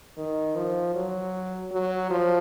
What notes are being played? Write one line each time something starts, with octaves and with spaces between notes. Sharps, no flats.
D#3
F3
F#3
F#3
F3